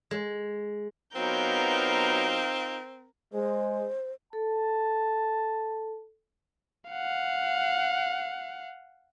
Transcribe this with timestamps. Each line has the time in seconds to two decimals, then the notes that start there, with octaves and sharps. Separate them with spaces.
0.11 G#3
1.15 F#3 B3 C4 D#4 F4 A#4 F5 G6
3.33 G#3 C5
4.33 A4 A5
6.90 F5 F#5